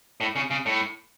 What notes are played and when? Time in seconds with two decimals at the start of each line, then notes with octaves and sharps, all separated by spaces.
0.21 A2
0.36 C#3
0.51 C#3
0.66 A2